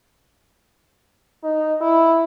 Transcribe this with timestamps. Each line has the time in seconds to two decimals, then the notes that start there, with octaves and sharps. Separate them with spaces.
1.43 D#4
1.81 E4